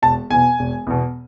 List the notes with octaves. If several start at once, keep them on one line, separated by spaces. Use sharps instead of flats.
E1 A5
E2 B2 G#5
E1
E2 B2